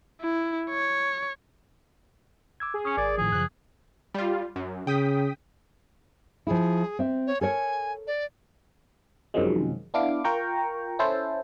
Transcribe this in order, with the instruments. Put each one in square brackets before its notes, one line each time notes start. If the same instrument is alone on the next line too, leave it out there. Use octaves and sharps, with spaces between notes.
[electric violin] E4
C#5
[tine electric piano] D6 E6 G#6
[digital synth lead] G#4
[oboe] C#4 [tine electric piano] D#6 C#7
[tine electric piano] G#1 A#4 G#6 [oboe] D5
[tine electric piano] A2 D#3 F3 [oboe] G#4
[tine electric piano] F#2 C#3 F3 [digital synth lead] F#6
[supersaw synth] G3 F4
F#2
[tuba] C#3 [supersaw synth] G5 D#6 B6
[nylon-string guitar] F3 E4 [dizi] G#4
[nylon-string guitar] C4 E5
[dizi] C#5
[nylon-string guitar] A4 A#4 C#5 [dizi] G#5
[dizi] D5
[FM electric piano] F#2 C3 D#3 F3 F#3 G#3
B3 D4 E4 F5 D6
F4 A#4 G5 A#5 C#6
C#4 E4 A4 C5